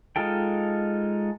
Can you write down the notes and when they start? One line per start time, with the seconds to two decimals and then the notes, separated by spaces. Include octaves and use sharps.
0.16 G#3 D#4 F4 A4 G5